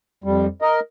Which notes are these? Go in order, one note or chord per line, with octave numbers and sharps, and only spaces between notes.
F2 G3
A#4 D#5